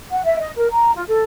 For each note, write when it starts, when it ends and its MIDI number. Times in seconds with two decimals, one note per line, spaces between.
0.11 0.23 78
0.25 0.38 76
0.39 0.51 75
0.57 0.67 70
0.71 0.91 82
0.94 1.02 65
1.07 1.23 69